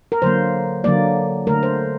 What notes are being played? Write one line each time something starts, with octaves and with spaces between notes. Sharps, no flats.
A#4
D3 F#3 A#3 C5
D3 F#3 A#3 D5
D3 A3 A#4
C5